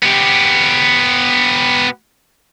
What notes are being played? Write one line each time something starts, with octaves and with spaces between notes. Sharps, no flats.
B3 G4